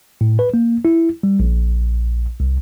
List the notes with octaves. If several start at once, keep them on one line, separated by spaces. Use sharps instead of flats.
A2
B4
A#3
E4
G3
A#1
C2